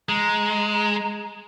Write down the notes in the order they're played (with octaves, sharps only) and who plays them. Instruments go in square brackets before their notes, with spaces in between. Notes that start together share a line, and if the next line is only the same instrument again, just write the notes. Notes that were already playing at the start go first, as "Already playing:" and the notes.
[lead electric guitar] G#3 [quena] A#5